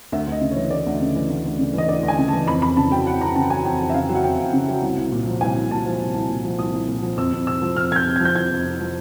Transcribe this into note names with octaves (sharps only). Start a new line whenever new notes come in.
D2 E5
D2 D#5
C#3
C#5
E3
D2 D5
D2
C#3
E3
D2
D2
C#3
E3 D#5
D2 D5
D2
G#5
C#3
A5
E3
F2 B5
F2 B5
C#3 A5
F#3 G5
F2 F#5
F2 A#5
C#3 A5
F#3 G#5
F2 G5
F2
E5
C#3 F5
F#3
F#5
F2 G5
F2
C#3
F#3
C2
C2
A#2
F3
C2 G#5
C2
A#2 A5
F3
C2
C2
A#2
F3
C2 D#6
C2
A#2
F3
F2 E6
F2
C3 E6
F3
F2 F6
F2 G6 G#6
C3
F3 G#6
G6
F2 G#6
F2
C3
F3